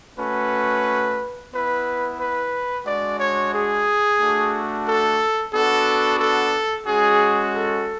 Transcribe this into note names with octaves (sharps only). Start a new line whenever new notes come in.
A3 C#4 F#4 B4
B3 E4 B4
B4
G#3 D4 F#4 D5
C#5
G#4
A3 D4 F#4
A4
B3 D4 F#4 A4
A4
G#3 C#4 F#4 G#4
A4